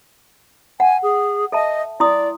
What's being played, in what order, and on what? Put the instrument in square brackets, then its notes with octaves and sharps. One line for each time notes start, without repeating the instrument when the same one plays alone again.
[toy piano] F#5 [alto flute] G#5
[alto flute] G#4
[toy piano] A4 E5 A5 [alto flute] D#5
[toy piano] E4 C6 D#6 [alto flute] D5